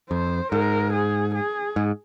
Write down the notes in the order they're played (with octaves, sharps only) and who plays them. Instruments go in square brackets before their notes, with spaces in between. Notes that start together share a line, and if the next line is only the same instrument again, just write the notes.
[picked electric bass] F2 [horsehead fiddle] C5
[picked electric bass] G#2 [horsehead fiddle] A#4
[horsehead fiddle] G#4
G#4
[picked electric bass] G#2